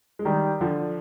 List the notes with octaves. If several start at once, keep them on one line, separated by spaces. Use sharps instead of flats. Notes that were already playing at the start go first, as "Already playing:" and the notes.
G#3
D#3 G3
D3 F3